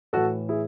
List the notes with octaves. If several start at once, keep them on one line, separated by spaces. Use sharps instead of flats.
A2 E3 F#4 A4
E4 G#4